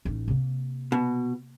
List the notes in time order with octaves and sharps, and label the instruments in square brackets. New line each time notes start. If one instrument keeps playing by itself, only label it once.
[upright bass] A1 D#4
C3 A#3
[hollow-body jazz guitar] B2